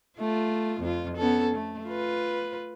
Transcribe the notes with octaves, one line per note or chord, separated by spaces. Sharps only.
A3 F4
F2 F4
B3 C#4 A4
A3
F4 B4